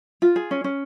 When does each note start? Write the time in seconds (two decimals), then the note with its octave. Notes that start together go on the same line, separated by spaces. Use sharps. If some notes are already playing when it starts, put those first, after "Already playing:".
0.22 F4
0.36 G#4
0.51 C#4
0.64 C#4